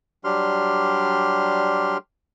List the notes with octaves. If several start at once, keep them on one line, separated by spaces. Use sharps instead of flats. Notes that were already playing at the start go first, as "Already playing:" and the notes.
F#3 G3 D4 G4 C6 F6